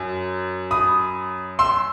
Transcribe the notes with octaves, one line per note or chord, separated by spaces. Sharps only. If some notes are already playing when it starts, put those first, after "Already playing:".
Already playing: F#2
B5 D#6
C6 E6